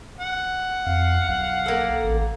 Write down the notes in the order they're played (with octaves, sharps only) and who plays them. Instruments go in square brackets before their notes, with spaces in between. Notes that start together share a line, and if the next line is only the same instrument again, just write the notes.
[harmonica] F#5
[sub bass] F2 [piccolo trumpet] F5
[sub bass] B1 [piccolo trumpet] F5
[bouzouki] A#3 A4
[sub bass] A1